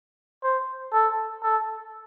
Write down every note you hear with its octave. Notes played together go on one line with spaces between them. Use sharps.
C5
A4
A4